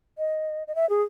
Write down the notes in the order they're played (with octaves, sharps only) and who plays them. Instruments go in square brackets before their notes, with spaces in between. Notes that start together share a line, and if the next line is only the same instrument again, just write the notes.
[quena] D#5
D#5
E5
G#4